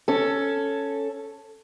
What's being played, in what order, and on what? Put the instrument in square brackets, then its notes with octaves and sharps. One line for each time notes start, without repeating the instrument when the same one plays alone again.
[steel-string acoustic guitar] C#4 A4